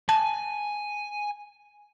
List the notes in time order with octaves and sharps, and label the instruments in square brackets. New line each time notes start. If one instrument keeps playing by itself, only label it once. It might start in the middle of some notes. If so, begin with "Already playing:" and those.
[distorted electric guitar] G#5 [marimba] A5